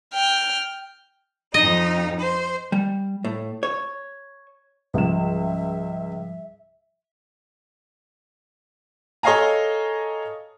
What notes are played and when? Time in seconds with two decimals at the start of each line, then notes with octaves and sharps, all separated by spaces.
0.14 G5 F6
1.54 F2 D#4 D#5
2.18 C5
2.72 G3
3.24 A2
3.63 C#5
4.94 C#2 G#2 F3 G3 E5 E7
9.23 A4 C#5 D#5 F5 G#5 A#5